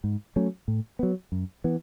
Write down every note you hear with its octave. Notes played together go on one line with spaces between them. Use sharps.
G#2
F#3 A3 C#4
A2
F#3 B3
F#2
E3 B3